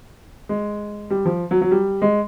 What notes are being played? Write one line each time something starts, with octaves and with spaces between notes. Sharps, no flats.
G#3
G3
F3
F#3
F#3
G3
G#3